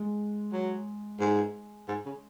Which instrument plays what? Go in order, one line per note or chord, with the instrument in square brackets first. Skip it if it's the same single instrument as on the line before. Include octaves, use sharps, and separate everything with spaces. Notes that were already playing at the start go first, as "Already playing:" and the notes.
Already playing: [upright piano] G#3
[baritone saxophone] F#3
G#2
G#2
C#3